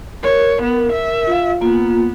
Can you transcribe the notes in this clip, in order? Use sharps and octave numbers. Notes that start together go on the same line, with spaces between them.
A#4 C#5
B3
E5
F4 F5
A#3 B3 F4